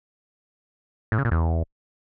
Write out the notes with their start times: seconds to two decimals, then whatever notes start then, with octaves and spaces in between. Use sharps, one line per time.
1.12 A2
1.18 C#3
1.25 A#2
1.31 E2